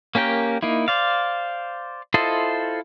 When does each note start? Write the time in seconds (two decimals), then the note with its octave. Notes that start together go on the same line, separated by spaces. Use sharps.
0.15 A#3 C#4 G4 A#4 G5
0.63 A#3 D#4 E4
0.88 C5 D5 F5
2.14 E4 F4 A4 C5 D#5